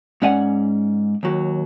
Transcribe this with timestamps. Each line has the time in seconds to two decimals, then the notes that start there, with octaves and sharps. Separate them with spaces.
0.22 G#2 C#4 D5 F#5 G#5
1.23 D#2 F#3